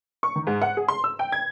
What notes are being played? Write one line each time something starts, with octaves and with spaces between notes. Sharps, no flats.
C#6
D#3
G#2
F#5
G#4
C6
E6
G5
G#6